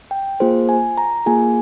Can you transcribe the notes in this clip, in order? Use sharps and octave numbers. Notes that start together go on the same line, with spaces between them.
G5
A#3 F4 G#4 C5
G#5
A#5
A#3 F4 G#4 G#5